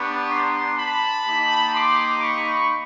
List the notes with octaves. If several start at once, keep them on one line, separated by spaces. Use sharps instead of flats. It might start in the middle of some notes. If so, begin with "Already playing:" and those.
Already playing: B3 D4 G4 B5 C#6
A#5 C6
A5 B5
A#3 D#4 G4
C6 D6
B5 C#6